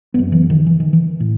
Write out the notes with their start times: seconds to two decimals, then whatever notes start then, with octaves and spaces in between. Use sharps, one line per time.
0.14 F#1 F#2 B3
0.32 E3
0.50 D#3
0.66 E3
0.80 D#3
0.93 E3
1.20 A2